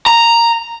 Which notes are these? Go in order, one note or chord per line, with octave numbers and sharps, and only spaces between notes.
A#5